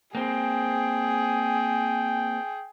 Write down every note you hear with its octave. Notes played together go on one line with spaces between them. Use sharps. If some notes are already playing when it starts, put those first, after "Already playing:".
A#3 C4 G#4 G5